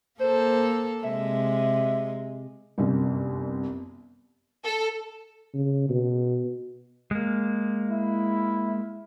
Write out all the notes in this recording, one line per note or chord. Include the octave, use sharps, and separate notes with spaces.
A#3 A4 C5
C3 G#3 E5
G1 C2 F#2
A4
C#3
B2
G#3 A#3
E4